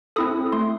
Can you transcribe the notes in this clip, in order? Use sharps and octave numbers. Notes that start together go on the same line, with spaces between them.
C4 E4 A4 D#6
A3 C6